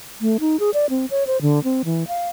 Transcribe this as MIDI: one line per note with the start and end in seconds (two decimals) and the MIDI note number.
0.21 0.37 57
0.40 0.59 63
0.60 0.70 68
0.74 0.86 74
0.90 1.06 60
1.11 1.24 73
1.27 1.40 72
1.42 1.62 50
1.64 1.82 60
1.85 2.07 52
2.08 2.29 77